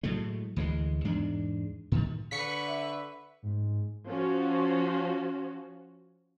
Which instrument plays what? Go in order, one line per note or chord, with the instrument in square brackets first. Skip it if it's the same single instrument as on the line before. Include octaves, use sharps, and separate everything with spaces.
[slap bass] A2 F#3 G#3 A3
D2 E3 G3 G#3
E2 G#2 G#3 D4
A2 D#3
[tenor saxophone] D3 [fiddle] B4 C#6 [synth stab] B6 C#7
[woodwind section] E5
[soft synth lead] G#2
[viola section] F3 C#4 F4 F#4